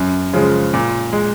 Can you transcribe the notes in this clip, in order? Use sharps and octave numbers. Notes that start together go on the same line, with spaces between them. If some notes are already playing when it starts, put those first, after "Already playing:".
Already playing: F#2
C#3 F3 G#3
A#2
G#3